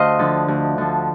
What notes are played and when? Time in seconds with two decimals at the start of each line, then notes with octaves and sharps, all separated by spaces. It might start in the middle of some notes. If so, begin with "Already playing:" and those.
Already playing: D2 C5 D#5 F5
0.19 D3 F3
0.48 D2
0.78 D3 F3